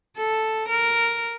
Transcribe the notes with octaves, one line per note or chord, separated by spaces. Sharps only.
A4
A#4